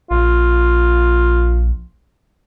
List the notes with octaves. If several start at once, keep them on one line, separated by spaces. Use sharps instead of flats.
A#1 F4